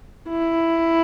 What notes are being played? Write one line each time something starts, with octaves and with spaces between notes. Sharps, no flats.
E4